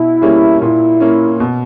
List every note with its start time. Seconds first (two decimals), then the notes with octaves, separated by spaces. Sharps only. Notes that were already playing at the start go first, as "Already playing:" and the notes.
Already playing: B2 E4
0.22 G3 A#3 C#4 G#4
0.61 A#2 E4
1.00 A#3 C#4
1.40 B2